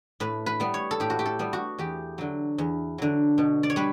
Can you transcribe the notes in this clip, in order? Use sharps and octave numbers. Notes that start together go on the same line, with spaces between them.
A2 B4
B4
G3 B3
C#5
A4
A2 G4
F#4
G4
A4
G3 B3
F#4
E2 G4
D3 F#3
E2
D3 F#3
B2
D5
C#5
G3 B4